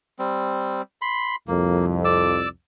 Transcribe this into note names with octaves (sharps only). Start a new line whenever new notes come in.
G3 C4
B5 C6
C2 F2 A#3
D5 D6 E6